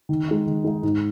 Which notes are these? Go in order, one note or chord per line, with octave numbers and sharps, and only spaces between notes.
D#3
G#3 D#4
D#3
G#3 D#4
G#2